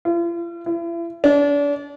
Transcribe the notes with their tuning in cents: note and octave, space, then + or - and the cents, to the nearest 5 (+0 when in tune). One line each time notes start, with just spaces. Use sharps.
F4 -45
E4 +40
D4 -35